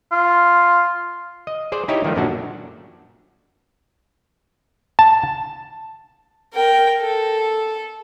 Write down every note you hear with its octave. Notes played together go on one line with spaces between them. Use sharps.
F4
D#5
G#4 C5 D5
D#4 E4 G4 C#5 D#5
D#3 F3 G3 A3
F#2 A#2 D3 D4 F#4
A5
A#4 G5
A4